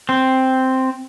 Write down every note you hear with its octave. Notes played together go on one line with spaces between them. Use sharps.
C4